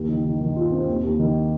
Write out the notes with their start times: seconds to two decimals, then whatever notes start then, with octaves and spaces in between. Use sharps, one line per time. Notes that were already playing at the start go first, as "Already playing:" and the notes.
Already playing: D#2
0.09 D#3
0.24 D#3
0.40 D#3
0.56 F4
0.72 C4
0.88 D#2
1.03 D#2
1.19 D#3